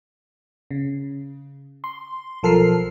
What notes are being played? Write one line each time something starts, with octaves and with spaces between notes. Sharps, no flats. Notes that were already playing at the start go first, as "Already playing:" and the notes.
C#3
C6
B1 F3 A4 A#4 F6 C7